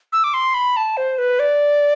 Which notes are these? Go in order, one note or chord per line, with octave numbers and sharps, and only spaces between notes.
E6
D6
C6
B5
A5
C5
B4
D5